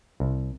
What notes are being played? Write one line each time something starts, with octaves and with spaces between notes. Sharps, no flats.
C2